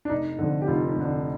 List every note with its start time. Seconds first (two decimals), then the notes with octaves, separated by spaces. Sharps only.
0.05 D4
0.10 F1 D#4
0.39 F2 D3
0.62 G4
0.67 F1 F4
0.96 F2 D3